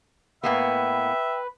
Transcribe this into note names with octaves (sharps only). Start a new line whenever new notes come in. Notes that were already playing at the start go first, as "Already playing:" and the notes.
A2 A#3 B3 B4 E5 G5